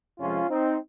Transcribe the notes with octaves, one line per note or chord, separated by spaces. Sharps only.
F2 C3 F3 G#3 C#4 F4
C4 D#4